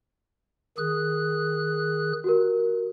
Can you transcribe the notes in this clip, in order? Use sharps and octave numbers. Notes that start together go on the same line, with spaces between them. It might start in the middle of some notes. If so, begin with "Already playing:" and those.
D#3 G#4 D#6 F#6
F#4 G4 A#4